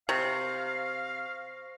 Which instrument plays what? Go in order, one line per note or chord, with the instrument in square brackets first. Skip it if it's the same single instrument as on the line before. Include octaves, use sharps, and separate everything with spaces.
[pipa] C3 [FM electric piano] C5 C#6 A#6 [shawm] F5